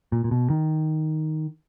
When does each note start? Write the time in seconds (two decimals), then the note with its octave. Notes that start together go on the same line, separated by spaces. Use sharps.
0.12 A#2
0.24 A#2
0.31 B2
0.50 D#3